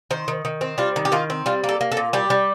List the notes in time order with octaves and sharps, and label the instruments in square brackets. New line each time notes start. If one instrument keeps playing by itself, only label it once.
[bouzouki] D#3 C5
D#3
D#3
C4
G3 F4
D#3
G4
D#3 F4
C4
G3 F4
A#3
A4
A#3
A4
A#2
G3 G4
G3